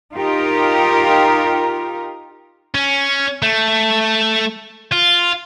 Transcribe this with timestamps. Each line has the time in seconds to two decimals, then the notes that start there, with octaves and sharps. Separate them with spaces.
0.14 D#4 F4 G4 A#4
2.75 C#4
3.42 A3
4.92 F4